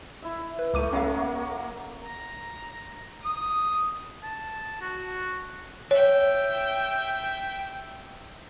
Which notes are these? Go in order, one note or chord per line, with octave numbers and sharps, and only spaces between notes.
E4 E5
B4
C#2 A3 A#3 D6 D#7
F#3 A#3 C#4 G#4 F5
A#5
D#6
A5
F#4
C#5 E5 G5